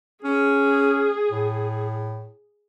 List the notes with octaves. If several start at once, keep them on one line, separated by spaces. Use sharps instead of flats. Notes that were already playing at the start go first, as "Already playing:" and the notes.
C#4 G#4
A2